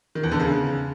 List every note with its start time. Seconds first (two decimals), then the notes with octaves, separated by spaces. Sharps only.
0.15 D#3
0.23 E2
0.32 D3
0.40 C#3